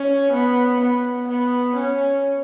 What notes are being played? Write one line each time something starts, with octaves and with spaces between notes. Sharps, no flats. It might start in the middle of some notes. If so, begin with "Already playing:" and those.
Already playing: C#4
B3
B3
B3
C#4